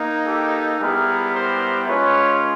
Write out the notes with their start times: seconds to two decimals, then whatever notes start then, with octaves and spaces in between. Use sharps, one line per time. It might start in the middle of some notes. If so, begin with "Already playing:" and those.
Already playing: A#3 D#4
0.26 G4 A4
0.81 G3 B3 E4 G4 G#4 A#4
1.34 A#4 C5
1.88 G#3 C#4 F4 B4 C#5